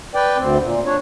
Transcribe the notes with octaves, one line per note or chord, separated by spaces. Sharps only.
B4 D5 G5
D2 C4
A#2
D4 C#5